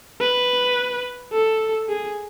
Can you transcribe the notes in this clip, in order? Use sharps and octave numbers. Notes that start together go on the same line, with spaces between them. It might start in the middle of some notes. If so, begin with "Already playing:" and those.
B4
A4
G#4